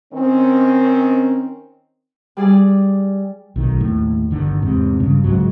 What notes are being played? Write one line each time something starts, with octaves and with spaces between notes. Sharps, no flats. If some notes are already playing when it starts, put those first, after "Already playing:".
D#3 C4 C#4
G3 G#4 D5 G#5
B1 D#3
D#2 A2
G1 D3 D#3
E2 G#2 C3
G2 C#3
C#2 G#2 F#3